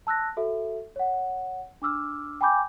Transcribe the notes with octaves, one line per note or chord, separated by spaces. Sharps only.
A5 E6 F#6 A#6
F#4 A4 E5
C#5 F#5
D4 D6 E6 F6
G5 G#5 B5 D6 G6